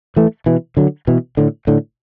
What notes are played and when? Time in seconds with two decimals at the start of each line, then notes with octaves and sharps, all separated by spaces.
0.16 E3 A3
0.46 B2 E3
0.77 D3 F#3
1.07 B2 E3
1.37 A2 D3
1.67 A2 D3